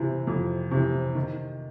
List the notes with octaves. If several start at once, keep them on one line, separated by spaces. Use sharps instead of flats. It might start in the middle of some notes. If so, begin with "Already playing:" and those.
Already playing: C3 E3
F2
C3 E3
D#3